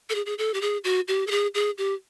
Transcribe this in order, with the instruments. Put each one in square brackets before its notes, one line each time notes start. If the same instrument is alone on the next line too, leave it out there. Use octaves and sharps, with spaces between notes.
[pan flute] A4
G#4
G#4
A4
G4
G#4
F#4
G4
A4
G#4
G#4
G4